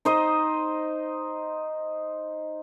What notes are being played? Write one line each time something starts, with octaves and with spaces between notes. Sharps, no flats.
D#4 C5 D#5